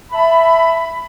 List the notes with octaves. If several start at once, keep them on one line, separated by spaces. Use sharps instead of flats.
E5 A5 B5